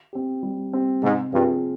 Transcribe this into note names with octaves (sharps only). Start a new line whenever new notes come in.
C4 G4
G3
C4 G4
G#2 C3
G2 F3 C4 F4 G#4